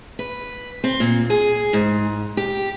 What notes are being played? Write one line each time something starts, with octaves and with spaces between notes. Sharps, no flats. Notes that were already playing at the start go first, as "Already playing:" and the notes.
B4
C4
A#2
G#4
G#2
G4